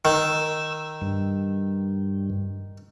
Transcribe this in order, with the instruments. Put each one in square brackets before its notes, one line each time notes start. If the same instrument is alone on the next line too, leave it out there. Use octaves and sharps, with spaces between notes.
[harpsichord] D#3 [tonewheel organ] E6
[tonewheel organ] G2